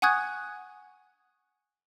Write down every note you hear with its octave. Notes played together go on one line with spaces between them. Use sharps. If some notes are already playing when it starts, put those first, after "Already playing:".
F#5 G#5 C#6 D#6 F#6 G#6